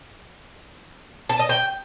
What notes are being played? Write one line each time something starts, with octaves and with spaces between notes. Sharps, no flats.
A5
D#5
G5